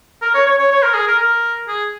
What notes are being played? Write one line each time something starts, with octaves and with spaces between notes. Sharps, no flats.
A#4
C#5
C#5
C#5
C#5
A#4
G#4
A#4
A#4
G#4